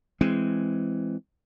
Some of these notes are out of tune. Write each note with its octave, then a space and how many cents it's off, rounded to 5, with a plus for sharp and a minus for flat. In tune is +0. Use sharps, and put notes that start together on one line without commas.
E3 +10 G#3 +0 C4 +0